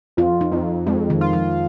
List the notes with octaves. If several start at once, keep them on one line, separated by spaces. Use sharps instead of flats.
F2 F4
D#4
F2
F2 G#3
D#3
F4
F3